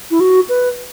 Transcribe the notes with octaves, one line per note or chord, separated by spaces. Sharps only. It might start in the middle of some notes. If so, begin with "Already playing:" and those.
E4
F#4
B4